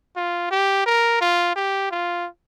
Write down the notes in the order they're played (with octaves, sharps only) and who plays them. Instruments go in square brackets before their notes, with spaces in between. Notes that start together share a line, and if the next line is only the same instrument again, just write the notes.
[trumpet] F4
G4
A#4
F4
G4
F4